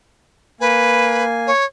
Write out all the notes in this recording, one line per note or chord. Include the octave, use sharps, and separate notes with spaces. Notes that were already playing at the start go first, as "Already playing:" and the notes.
A#3 B4 G#5
C#5